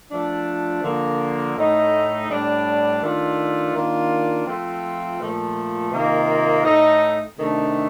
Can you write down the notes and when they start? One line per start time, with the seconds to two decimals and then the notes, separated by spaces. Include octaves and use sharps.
0.10 F3 A3 D4
0.83 D3 F3 A#3
1.55 A2 A3 D#4
2.28 A2 G3 D4
3.01 D#3 A3 D4 F4
3.73 D#3 A#3 D4 F4
4.46 F3 A3 C4 F4
5.19 A#2 F3 A3
5.91 C3 D#3 A#3 F4
6.64 A2 A3 D#4
7.36 C3 D#3 A3 D4